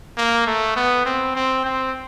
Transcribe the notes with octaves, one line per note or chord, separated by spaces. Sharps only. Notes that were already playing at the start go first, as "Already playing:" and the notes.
A#3
A3
B3
C4
C4
C4